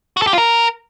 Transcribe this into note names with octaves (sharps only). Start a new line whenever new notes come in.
F#4
A4
G4
F4
A#4